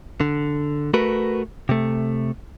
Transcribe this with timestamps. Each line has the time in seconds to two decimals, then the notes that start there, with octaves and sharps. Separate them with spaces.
0.21 D3
0.94 A3 F#4 A#4 B4
1.69 C3 A3